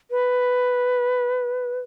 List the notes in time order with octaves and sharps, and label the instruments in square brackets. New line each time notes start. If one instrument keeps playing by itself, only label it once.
[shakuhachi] B4